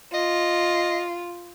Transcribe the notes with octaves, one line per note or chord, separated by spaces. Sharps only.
F4 D#5